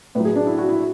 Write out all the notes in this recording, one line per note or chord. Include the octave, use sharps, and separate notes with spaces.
A2 F#3 B4
G#4
D4
E4
F#4
E4